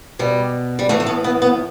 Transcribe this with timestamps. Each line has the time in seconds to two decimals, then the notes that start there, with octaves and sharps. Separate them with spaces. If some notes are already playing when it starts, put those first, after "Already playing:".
0.19 B2 G3
0.79 G3
0.89 A2 E3 A3
1.00 A3
1.07 B3
1.24 B3
1.42 B3